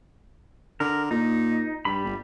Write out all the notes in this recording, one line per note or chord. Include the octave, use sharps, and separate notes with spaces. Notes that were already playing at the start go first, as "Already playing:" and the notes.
D3 A#4
A#2 D#4
G2 G3 B5
G1